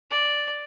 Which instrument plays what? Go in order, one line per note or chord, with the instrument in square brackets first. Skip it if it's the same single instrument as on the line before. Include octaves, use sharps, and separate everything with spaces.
[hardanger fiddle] D5